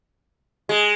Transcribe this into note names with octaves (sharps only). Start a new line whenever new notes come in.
G#3